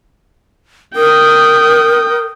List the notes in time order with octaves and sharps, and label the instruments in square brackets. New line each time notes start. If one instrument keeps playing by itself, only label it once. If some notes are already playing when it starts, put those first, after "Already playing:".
[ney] A#4 [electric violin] G5 D#6